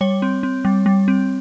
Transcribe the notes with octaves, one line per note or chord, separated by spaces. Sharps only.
G3 C#5
C4
C4
G3
G3
C4